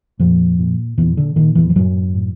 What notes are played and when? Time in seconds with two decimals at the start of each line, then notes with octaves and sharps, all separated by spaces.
0.19 F2 A#2 F3
0.59 A#2
0.98 E2 A#2 E3
1.17 D3
1.36 A#2 D#3
1.55 E2 E3
1.70 F3
1.75 F#2 A2 F#3
2.14 A2